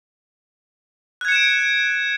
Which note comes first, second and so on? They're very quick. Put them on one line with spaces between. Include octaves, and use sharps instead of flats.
F#6 G#6 C#7 E7 D7